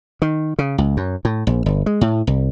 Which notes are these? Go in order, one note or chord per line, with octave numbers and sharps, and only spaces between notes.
D#3
C#3
C#2
F#2
A2
A#1
G1
G#3
A2
C2